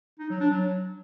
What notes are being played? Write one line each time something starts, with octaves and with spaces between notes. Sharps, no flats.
D#4
F#3
D4
F#3